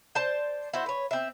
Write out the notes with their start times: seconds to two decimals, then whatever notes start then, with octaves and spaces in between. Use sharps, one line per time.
0.15 C5 D5 A5
0.73 E4 F#4 C5
0.86 B4 C#5
1.11 C4 E5